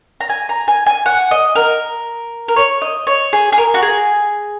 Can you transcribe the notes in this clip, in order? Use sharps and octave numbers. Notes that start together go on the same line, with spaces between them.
A#5
G#5
A#5
G#5
G#5
F#5
D#5
A#4
A#4
C#5
D#5
C#5
G#4
G#4
A#4
F#4
G#4